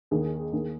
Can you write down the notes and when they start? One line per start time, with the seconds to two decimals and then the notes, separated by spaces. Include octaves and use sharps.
0.11 D#2 D#3 G#4
0.52 D#2 D#3